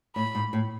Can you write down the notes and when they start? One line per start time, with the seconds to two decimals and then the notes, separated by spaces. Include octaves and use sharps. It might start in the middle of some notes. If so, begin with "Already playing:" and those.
0.15 A2 B5
0.35 G#2
0.53 A2